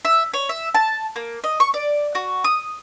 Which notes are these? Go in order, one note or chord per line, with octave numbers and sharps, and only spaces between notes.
E5
C#5
E5
A5
A#3
D#5
C#6
D5
F#4
D#6